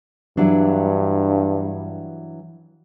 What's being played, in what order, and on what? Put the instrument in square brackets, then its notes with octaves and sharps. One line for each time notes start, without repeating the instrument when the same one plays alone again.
[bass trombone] G2 [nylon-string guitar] E3 F#3 D4